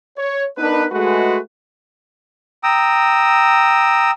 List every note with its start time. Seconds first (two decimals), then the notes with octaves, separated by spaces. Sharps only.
0.18 C#5
0.58 B3 D4 D#4 A#4 B4
0.92 G#3 A3 F#4 B4
2.63 G5 A#5 D#6 E6